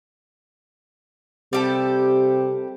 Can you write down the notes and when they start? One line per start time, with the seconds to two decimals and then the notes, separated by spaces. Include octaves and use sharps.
1.53 C3 G3 G4 A4